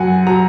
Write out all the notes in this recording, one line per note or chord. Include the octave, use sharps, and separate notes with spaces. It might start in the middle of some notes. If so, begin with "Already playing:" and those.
Already playing: F#2 F#3 F#5 G#5
F#3 A#5